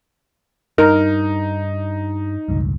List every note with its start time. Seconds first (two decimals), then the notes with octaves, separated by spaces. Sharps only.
0.78 G2 D#4 A#4
2.48 E1 C#2 G2